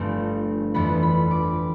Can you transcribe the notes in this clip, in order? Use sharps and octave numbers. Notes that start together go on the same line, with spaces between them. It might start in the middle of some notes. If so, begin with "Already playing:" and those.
Already playing: G1 G2 F3 A3 C4
G1 F2 E3 B3 B5
B5
D6